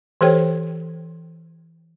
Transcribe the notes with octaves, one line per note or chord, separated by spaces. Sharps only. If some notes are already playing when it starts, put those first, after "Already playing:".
E3 G4 A4 C5 C#5 G5